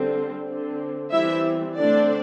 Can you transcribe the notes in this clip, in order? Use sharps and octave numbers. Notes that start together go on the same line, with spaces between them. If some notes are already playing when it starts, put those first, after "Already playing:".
Already playing: D3 G3 C4
D3 C4
E3 G3 C4 E4 E5
D3 A3 C4 D4 D5